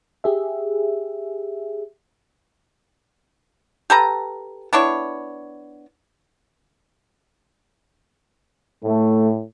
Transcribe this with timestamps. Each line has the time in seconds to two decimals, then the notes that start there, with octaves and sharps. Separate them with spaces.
0.24 G4 G#4 E5
3.90 G4 A4 B4 A#5
4.73 B3 D4 E4 C#5
8.84 A2 A3